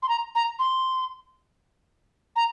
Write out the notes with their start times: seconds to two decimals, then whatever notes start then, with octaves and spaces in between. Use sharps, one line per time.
0.02 C6
0.09 A#5
0.35 A#5
0.59 C6
2.36 A#5